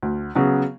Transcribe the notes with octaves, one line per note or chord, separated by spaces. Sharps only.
D2
C#3 F#3 B3